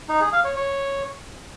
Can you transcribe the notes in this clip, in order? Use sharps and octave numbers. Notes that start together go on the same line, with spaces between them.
D#4
G#4
F5
C#5
C#5